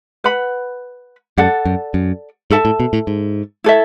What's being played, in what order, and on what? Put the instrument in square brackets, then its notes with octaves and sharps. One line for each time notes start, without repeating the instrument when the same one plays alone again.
[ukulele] B4 F#5 B5
[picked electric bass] F#2 [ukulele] A4 D5 F#5
[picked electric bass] F#2
F#2
[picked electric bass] G#2 [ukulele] A4 E5 A5
[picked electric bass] A2
B2
A2
G#2
[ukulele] E4 A4 C#5 E5